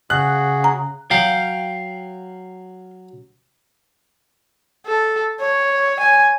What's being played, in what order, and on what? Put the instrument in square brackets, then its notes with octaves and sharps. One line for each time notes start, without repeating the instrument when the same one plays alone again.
[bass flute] C#3 [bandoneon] F#4 G#4 [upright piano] F#6
[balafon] A#5
[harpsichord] F#3 [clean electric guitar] F5 G5
[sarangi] A4
C#5
G#5